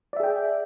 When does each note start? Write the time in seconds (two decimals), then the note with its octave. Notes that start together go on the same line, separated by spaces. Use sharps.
0.13 D5
0.17 E5
0.20 G#4
0.23 G5